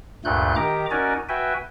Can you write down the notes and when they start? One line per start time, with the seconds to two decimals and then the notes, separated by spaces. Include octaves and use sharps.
0.25 D2 G2 A#2 A3 F#6 G6
0.56 D#3 G4 A#5 D6
0.91 C#4 D#4 F#4 A#4 D5 G#5
1.29 F#4 B4 E5 G5 G#5